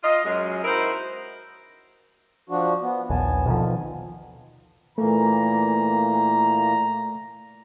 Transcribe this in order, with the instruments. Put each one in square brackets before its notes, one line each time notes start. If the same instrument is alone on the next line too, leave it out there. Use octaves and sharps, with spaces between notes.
[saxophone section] F4 D#5
F#2 G#3
D#4 E4 F#4 A#4 C5
[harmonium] F3 D4 F#4
B3
[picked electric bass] A#1 D#2 [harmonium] B3 G#5 A5
[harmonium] F2 D3 [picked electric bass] B2 D#3 F3
[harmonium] A#2 E3 A#3 [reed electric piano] A3 A4 [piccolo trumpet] A#5